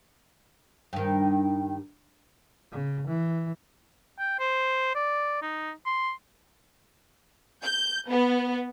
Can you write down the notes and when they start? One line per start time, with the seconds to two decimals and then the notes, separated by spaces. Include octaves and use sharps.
0.93 G2 D#3
2.72 C#3
3.07 E3
4.19 G5
4.39 C5
4.95 D5
5.42 D#4
5.86 C6
7.62 G6
8.09 B3